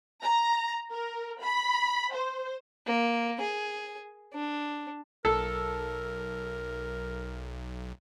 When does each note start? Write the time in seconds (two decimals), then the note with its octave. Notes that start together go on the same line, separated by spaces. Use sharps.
0.23 A#5
0.92 A#4
1.42 B5
2.13 C5
2.86 A#3
3.40 G#4
4.33 D4
5.25 B1 A4 A#4